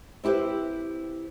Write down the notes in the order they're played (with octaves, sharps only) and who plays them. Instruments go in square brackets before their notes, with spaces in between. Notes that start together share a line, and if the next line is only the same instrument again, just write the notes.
[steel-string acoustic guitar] C4 E4 G4 B4 C5